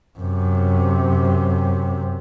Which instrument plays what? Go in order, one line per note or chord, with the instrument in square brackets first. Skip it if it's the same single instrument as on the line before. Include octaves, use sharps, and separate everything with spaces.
[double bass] F#2 C3